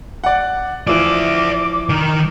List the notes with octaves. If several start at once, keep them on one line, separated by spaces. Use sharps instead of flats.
D5 F#5
E3 F3 D5 E5 D6
D#3 A#4